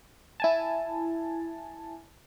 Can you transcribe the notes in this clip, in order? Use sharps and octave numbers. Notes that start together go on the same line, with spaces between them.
E4 G#5 A5